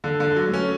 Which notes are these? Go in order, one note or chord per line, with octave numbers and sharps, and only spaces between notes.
D3 A4
D3
A4
F#3
A3
C#4